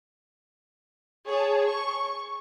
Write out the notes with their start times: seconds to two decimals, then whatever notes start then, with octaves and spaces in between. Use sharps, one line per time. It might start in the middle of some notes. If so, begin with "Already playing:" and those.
1.29 G#4 C#5 A5
1.65 C#6